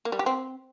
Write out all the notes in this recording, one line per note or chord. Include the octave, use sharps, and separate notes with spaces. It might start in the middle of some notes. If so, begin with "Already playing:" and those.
A#3
G3
G4
C4